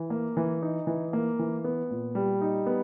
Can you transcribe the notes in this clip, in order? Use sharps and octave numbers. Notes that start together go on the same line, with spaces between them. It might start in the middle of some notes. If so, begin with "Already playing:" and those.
Already playing: E3
A#3
E3
D#4
E3
A#3
E3
B3
A#2
G3
D#4
B3